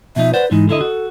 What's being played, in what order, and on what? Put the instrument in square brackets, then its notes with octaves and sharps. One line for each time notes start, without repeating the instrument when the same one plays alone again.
[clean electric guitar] B2 F3 D#4 [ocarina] E5
[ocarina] B4 [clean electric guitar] C5 D5 F#5
[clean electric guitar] G#2 E3 [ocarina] D#4
[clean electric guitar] D3 E4 D#5 [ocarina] A4
[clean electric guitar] F#4